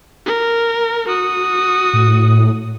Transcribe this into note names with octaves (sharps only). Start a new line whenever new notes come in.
A#4
F#4 D#6
A2